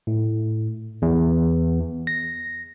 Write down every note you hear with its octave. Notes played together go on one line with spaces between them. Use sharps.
A2
E2
A#6